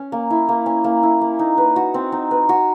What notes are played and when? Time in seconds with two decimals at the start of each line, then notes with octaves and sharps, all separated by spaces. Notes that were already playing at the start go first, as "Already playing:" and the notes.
Already playing: C#4
0.12 A#3
0.31 E4
0.49 A#3
0.66 C#4
0.84 A#3
1.03 E4
1.21 A#3
1.39 D#4
1.58 B4
1.76 F#4
1.94 C4
2.12 D#4
2.31 B4
2.49 F#4